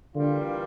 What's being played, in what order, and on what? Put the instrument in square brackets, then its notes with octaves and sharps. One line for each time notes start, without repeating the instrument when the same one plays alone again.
[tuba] D3 [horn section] E3 G3 A#3 F4